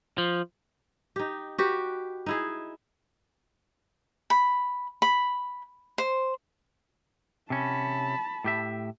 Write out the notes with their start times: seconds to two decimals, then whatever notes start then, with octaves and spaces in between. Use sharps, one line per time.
0.18 F3
1.16 D#4 G4
1.58 F#4 G4 B4
2.26 D#4 E4 G#4
4.30 B5
5.02 B5
5.98 C5
7.50 C3 C#4 A5 B5
8.44 A2 G4 E5